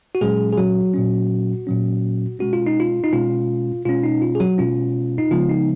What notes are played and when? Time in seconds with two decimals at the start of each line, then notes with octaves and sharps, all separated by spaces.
0.15 F#4
0.21 A#2 F#3 G#3 C#4 G#4
0.53 G#4
0.57 F#3 F#4
0.94 A#2 F#3 C#4
1.67 A#2 F#3 C#4
2.39 B2 G#3 C#4 F#4
2.53 F4
2.67 D#4
2.80 F4
3.04 D#4
3.13 B2 G#3 C#4 F4
3.85 B2 G#3 C#4 F4
4.04 D#4
4.22 F4
4.35 G#4
4.40 F#3 F#4
4.58 B2 G#3 C#4 F4
5.18 D#4
5.31 C#3 F3 G#3 B3 F4
5.49 D#4